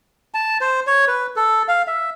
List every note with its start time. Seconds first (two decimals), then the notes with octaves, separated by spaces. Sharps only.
0.34 A5
0.61 C5
0.87 C#5
1.08 B4
1.36 A4
1.68 F5
1.87 E5